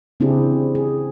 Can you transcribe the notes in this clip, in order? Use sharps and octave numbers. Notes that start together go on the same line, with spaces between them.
C#3 C4 D4 E4 G4 G#4
G#4